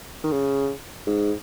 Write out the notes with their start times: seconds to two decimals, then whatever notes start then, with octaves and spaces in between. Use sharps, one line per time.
0.24 D#3
0.32 C#3
1.07 G#2